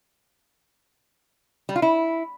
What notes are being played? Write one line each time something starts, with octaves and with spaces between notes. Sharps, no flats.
G3
F4
E4